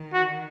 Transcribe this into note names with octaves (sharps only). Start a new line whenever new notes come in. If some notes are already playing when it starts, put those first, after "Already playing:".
Already playing: D#3
F#4